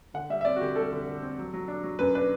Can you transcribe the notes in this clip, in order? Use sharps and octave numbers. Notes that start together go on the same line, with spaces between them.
D3 F#5
G3 E5
E5
C4 D5
F#4
D3 G4
G3 A4
D3
D3
C4
F#3
F#3
D4
F#3
F#2 B4
D4 B4